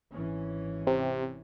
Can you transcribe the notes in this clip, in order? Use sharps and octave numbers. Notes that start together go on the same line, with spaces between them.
G#1 E3 C#4
C3